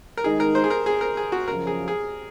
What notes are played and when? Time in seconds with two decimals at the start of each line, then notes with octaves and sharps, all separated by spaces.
0.17 A#4
0.24 D#3 G#3 D#4 G#4
0.40 A#4
0.55 C5
0.64 G#4
0.70 A#4
0.86 G#4
1.01 A#4
1.17 G#4
1.32 F#4
1.47 F#2 C#3 F3 A#4
1.67 G#4
1.88 G#4